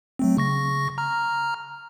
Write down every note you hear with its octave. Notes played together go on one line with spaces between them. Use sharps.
F#3 A3 C4
C#3 C#6 A#6
A#5 F6